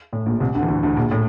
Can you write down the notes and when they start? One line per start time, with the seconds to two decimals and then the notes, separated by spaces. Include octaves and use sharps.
0.13 A2
0.26 A#1 A#2
0.40 C2 C3
0.55 D2 D3
0.63 E3
0.68 D2 D3
0.83 D2 D3
0.97 A#1 A#2
1.11 A2